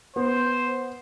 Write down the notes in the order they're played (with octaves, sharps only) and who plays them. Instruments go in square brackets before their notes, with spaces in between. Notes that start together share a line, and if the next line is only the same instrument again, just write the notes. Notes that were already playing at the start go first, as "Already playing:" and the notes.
[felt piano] B3 [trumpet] C5